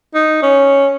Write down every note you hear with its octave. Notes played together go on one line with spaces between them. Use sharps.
D#4
C#4